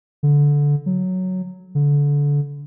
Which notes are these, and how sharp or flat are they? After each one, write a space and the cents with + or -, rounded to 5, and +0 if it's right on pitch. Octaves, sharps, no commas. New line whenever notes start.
D3 -15
F#3 +0
D3 -25